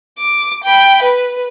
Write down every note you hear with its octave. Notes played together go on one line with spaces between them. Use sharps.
D6
G5 B5
B4